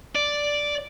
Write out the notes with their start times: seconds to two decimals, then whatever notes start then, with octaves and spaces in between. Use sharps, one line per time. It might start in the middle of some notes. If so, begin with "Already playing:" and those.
0.15 D5